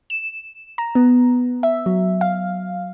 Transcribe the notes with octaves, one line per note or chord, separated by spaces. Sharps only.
E7
A#5
B3
E5
F#3
F5